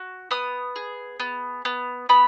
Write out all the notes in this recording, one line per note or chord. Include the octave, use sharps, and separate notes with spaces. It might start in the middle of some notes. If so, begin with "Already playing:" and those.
Already playing: F#4
B3 D#6
G#4
B3
B3
B3 B5